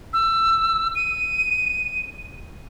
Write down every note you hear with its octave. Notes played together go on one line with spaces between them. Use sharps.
E6
D#7